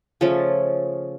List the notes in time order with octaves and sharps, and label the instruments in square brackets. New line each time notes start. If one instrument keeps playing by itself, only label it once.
[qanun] C#3 F3 A3 C#4